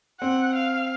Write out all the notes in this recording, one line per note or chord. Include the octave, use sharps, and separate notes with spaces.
C4 F#5
F5